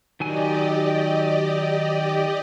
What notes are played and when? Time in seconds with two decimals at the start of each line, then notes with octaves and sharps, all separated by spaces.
0.20 D#3 F#3 G4 D5 D#5 G#5